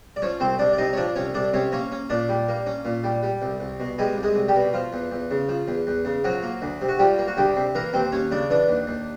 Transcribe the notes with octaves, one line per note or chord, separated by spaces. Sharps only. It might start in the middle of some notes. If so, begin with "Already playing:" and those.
D5
F3 C#4 C#5
C2 C4 C5
C2 D4 D5
D5
C3 D#4 D#5
C#5
F3 D4 D5
C2 C#4 C#5
C2 D4 D5
C3 C#4 C#5
A#3 C#4 C#5
C#4
A#2 D4 D5
G3
A#3
C#4
A#2
G3
G3
C2
C2
B2
G3 G#3 G#4
C2
G#3 G#4
C2
G3 G4
B2
F3 F4
E2
E2
C#3
F3
E2
E2
C#3
F3 F#3 F#4
A#3
D2
C3
F#4
F3 G3 G4
A#3
F#4
D2 G3 G4
C3
E3 A#3 A#4
D#2 C4 C5
D#2 C#4 C#5
C#3 D4 D5
E3 D4 D5
D#2
D#2